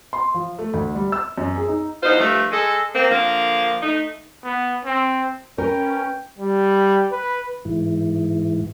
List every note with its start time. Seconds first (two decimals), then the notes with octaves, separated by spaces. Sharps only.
0.13 C6
0.34 F3
0.59 A3
0.74 D2
0.95 G3
1.12 E6
1.38 F#2
1.56 G#4
1.68 D#4
2.03 E2 D#4 F4 C5
2.19 G2 F3 A3
2.51 G#3 A4
2.95 A#3 C4
3.10 D3 F3 A#3
3.82 A3 D#4
4.44 B3
4.85 C4
5.58 C#4 A#4 B4 G5
6.38 G3
7.12 B4
7.65 G#2 E3